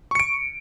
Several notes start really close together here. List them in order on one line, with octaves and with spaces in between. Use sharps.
C#6 C#7 D7